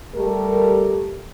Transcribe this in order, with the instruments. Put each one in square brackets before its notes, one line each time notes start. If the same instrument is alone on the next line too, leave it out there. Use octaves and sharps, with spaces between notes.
[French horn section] G3 A3 G4 A4 A#4